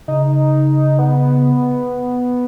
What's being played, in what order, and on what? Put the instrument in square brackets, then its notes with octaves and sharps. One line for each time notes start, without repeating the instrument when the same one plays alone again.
[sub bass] C#3 [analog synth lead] D#4
[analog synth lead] B3